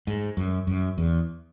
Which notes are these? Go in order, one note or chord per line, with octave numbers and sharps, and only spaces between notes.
G#2
F#2
F#2
E2